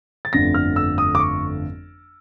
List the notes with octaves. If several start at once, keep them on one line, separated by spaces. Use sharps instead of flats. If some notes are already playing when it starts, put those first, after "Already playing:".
A6
G1 F2 D3 F3 A3 A#6
F6
E6
D#6
D6
C#6